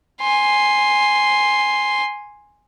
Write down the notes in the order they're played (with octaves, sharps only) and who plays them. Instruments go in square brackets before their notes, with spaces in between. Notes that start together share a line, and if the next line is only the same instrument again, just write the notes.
[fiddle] G#5 C6